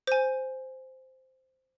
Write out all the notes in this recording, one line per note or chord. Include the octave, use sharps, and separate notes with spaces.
C5 G#5